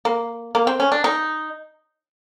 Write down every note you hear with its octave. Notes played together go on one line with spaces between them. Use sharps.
A#3
A#3
C4
C#4
D4
D#4